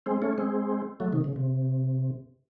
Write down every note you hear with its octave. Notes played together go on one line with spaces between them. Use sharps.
G#3 C4
A3 C#4
G#3 C4
F#3 A3
C3 D#3
C#3
C3